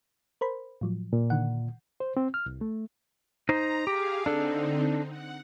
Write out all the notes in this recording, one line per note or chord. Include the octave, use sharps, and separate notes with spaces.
A#4 C5 B5
A2 F3 F#3
A#2
D3 D#3 F#5
C5
C4
F6
C2
A3
D#4 C5 A#5
G4 G#4 F5
D3 C4 D4 D#4 A4
F#5